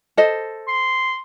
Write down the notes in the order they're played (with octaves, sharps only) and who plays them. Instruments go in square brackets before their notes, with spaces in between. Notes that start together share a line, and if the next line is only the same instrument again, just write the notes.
[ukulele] A4 C5 D#5
[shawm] C6